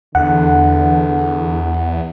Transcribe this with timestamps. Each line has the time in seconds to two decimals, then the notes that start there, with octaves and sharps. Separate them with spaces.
0.15 E2 D3 F#5